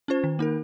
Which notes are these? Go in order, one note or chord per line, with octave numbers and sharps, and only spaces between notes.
C#4 F4 C5
D#3
A#3 D#4 A#4